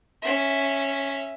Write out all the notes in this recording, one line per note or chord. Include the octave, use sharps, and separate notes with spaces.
C#4 E5